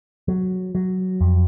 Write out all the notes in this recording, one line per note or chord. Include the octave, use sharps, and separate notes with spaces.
F#3
F#3
F2